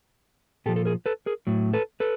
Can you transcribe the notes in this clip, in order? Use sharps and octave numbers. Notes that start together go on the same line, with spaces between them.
A#2 F3 G4 A4
A4
G#4 A#4
A4 B4
G#4 A#4
A2 F#3
A4 B4
A4 B4